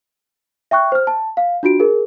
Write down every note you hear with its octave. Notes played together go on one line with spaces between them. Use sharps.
E5 G5 C#6 F#6
C5 F6
A5
F5
D4 F4 F#4 D7
G#4 A#4